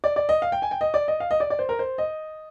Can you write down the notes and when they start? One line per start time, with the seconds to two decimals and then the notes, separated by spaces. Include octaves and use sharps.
0.04 D5
0.16 D5
0.29 D#5
0.42 F5
0.52 G5
0.62 G#5
0.71 G5
0.81 D#5
0.94 D5
1.08 D#5
1.20 F5
1.31 D#5
1.40 D5
1.50 D5
1.59 C5
1.69 A#4
1.79 C5
1.98 D#5